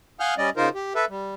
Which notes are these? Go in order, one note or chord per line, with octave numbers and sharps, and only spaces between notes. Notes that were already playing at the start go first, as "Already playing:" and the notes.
F5 F#5 G#5 D#6 F6 G6
G3 C#4 D5 D#5
C#3 D#4 F4 A#4 C5
G4
A4 B4 E5
G3